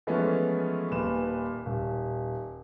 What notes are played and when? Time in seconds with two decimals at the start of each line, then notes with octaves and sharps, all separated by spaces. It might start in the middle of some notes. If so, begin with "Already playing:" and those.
0.07 E3 F3 G#3 A3 B3 C#4
0.91 D#1 A#2 B4 E7
1.66 D#1